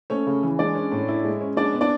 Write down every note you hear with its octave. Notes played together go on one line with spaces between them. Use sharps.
A3 C#4 C#5
C#3
E3
G#3 D4 D5
C#4
A2
E4
G#3
C#4
G#3 D4 D5
B3
D4 D5